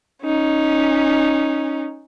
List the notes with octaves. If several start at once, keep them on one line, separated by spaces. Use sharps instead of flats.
C#4 D#4